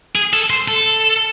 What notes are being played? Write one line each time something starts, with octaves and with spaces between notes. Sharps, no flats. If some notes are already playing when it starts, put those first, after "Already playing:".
G#4
A4
C5
A4